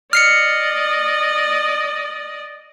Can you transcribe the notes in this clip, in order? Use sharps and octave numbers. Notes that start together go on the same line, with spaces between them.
D5 D#5 F6 C7 C#7